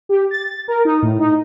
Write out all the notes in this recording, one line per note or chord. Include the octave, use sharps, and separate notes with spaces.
G4
A6
A#4
D#4
A2
D#4